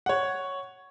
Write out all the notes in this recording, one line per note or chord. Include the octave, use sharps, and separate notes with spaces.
C#5 F#5